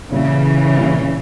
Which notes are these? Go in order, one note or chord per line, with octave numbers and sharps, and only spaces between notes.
A#2 C#3 E3 G3 C#4 E4
A#2 G3 C#4 E4